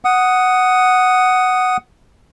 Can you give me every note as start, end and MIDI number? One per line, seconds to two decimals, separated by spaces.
0.05 1.77 78
0.05 1.77 87